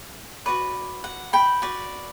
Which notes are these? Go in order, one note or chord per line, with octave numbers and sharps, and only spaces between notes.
F#4 B4 D5
F#5
G5 B5
F#4 B4 D5